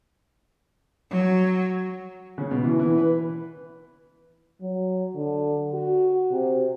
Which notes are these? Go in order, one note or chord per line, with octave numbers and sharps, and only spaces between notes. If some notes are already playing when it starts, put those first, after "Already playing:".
F#3
C#3
B2
E3
E3
B4
F#3
D3
F#4
C3